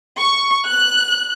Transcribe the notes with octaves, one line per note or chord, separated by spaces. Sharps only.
C#6
F#6